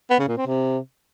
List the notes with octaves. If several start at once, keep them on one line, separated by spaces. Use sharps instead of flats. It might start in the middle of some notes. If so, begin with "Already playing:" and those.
B3
C#3
A#2
C4
C3